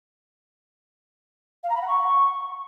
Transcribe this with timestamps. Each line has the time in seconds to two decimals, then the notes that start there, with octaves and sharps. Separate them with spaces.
1.63 F5
1.69 A#5
1.75 B5
1.81 F#5
1.88 C#6